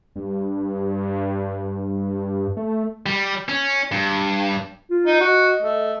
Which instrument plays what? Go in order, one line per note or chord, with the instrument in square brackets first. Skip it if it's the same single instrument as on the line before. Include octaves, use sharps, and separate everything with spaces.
[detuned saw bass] G2
A3
[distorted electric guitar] G3
C#4
G2
[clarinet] F4
[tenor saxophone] D#4
[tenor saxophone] F#4 [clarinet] D#5
[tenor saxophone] A3